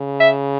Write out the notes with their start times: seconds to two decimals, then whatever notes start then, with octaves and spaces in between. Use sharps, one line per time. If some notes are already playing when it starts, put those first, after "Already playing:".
Already playing: C#3
0.20 E5